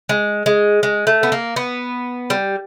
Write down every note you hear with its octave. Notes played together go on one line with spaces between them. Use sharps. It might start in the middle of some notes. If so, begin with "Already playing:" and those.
G#3
G#3
G#3
A3
B3
A#3
B3
G3